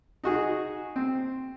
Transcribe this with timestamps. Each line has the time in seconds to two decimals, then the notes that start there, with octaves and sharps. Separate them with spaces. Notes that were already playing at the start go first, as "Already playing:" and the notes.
0.24 D#4 F#4 G#4
0.96 C4